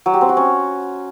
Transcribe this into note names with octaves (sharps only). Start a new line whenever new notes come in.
F#3
G4
C4
F#4
C#4